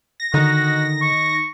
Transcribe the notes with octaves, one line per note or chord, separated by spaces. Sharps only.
A#6
D3 D#3 D#4 F#4
C#6